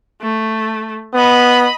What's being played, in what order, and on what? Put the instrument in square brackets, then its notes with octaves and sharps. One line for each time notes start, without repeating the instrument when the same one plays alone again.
[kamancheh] A3
[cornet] B3 [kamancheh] D#5 B5